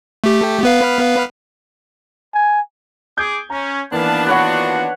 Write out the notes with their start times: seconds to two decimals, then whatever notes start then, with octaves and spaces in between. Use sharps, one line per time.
0.24 A3 G4
0.63 B3 B4 F5
2.34 G#5
3.17 G#4 D6 D#6 G6 G#6
3.50 C#4 A#5
3.92 D#3 E3 A#3 B3 D4 B4 F5 A5
4.27 F4 F#4 B4 C#5 F#5